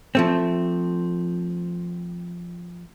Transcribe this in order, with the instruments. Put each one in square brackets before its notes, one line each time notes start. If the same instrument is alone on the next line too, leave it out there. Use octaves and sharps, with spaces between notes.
[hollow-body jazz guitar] F3 A3 C4